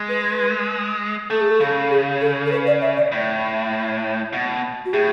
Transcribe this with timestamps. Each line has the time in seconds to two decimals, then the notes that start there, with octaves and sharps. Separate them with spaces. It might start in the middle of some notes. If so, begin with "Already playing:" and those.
Already playing: G#3
0.09 B4
1.30 A3 A4
1.40 G#4
1.50 A4
1.60 C#3
1.90 G#4
2.21 A4
2.46 A4
2.51 B4
2.66 D5
2.81 E5
2.97 D5
3.12 A2
4.33 B2
4.85 F#4
4.93 A2 G#4